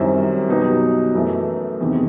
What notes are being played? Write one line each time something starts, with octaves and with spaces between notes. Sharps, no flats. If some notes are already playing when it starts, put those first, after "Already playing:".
Already playing: F#2 D#3 G3 C4 E4
B2 F#3 B3 D#4 G4
F#2 E3 A3
E2 C3 D#3